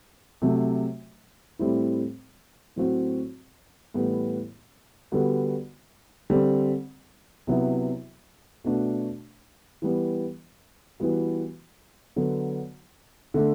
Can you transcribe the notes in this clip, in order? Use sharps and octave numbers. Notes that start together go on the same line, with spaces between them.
C3 F#3 A3
A2 G3 C4 E4
A2 F#3 C4 F#4
A2 E3 G3 B3
D3 G3 B3 F#4
D3 G3 C4
C3 F#3 B3 E4
B2 A3 D4 F#4
E3 G3 B3
E3 G3 B3 F#4
D3 F#3 B3
D3 A3 D4